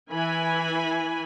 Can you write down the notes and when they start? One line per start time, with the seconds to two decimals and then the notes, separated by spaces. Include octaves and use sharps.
0.11 E3 G#5 B5